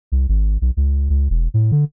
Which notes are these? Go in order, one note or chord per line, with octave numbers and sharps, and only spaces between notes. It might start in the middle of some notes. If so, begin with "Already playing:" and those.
C2
G#1
B1
C#2
C#2
E1
A2
D3